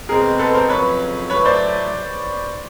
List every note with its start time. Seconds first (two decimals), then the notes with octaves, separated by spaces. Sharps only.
0.09 B2 G#3 C4 G#4 A#4
0.39 A4 B4
0.54 A#4 C5
0.69 F2 C#3 F#3 B4 C#5
1.30 A2 F#3 A3 B4 C#5
1.45 C5 D5